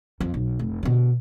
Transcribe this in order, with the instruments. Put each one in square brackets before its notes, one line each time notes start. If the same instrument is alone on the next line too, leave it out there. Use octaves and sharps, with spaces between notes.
[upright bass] F2
B1
F1
B2 D3